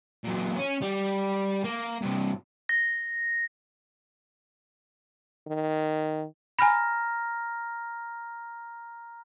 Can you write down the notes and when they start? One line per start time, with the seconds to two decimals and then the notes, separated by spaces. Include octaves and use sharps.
0.24 A#2 F#3
0.56 C#4
0.82 G3
1.64 A#3
2.02 G2 C3
2.69 A#6
5.47 D#3
6.59 G#5 A#5 B5 F6 A#6